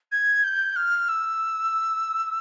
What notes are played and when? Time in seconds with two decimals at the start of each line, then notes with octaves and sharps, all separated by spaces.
0.12 G#6
0.44 G6
0.76 F6
1.09 E6